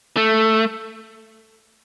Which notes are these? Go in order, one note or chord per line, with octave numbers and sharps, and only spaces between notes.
A3